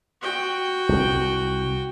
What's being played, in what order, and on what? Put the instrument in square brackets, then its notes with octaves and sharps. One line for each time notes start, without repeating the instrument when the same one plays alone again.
[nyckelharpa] F#4 G5
[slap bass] C2